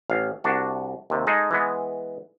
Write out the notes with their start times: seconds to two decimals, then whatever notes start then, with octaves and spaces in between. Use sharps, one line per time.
0.10 A1 F5
0.44 C2 D4 F#4
1.10 D#2 C3
1.27 G#3 D#4 G#4 A4
1.51 E3 G#3 B3